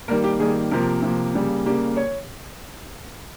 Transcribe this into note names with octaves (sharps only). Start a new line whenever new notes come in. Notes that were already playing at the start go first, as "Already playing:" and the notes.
D#3 G3 A#3 A#4
G4
D#3 G3 A#3 G#4
C3 F3 A#3 A#4
C3 F3 A#3
C#3 G3 A#3
C#3 G3 A#3 G4
C#5